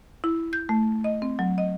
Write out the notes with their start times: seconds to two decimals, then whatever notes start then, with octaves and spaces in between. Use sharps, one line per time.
0.24 E4
0.53 G6
0.69 A3
1.04 D#5
1.22 C4
1.39 F#3
1.58 D#5